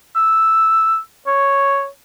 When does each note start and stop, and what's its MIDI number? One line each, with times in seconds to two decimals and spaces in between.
0.16 0.98 88
1.27 1.87 73